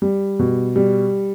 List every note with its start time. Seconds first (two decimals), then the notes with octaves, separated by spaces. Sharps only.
0.02 G3
0.39 B2
0.76 G3